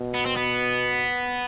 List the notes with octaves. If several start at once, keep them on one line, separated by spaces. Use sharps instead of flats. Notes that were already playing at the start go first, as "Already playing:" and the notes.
Already playing: B2
B3
C4
B3